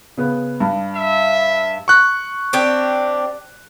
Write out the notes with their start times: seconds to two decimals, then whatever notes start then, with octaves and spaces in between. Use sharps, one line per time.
0.18 C#3 B3
0.60 G2
0.95 E5
1.88 C#6 F#6
2.53 C4 D4 G4